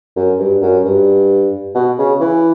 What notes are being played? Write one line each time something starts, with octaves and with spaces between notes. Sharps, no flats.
F#2
G2
F#2
G2
B2
C#3
E3